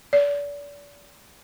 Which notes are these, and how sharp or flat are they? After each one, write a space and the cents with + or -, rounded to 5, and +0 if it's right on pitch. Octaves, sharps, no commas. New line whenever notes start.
D5 -35